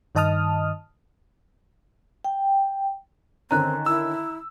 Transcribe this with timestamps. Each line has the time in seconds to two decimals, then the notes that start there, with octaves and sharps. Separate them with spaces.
0.15 G2 D#3 D#5 A5 D#6 F6
2.24 G5
3.51 D3 D#3 C4 C#4 A#5 F#6
3.86 E4 E6